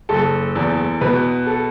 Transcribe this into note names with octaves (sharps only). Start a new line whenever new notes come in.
F#1 A4
E2
B2 B4
A4